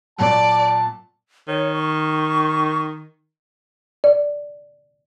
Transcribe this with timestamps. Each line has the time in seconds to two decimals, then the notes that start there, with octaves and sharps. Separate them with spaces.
0.18 A#2 F#3 D5 A5
1.48 D#3 C#5
1.74 C#6
4.04 D5